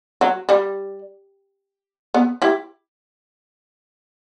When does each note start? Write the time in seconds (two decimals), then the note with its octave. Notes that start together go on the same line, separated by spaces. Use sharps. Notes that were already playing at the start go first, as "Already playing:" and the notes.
0.21 F#3
0.49 G3
2.14 B3
2.42 E4 G4